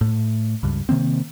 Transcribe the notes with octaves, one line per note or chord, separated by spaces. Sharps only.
A2
C#2 G2
C3 D#3 A#3 C4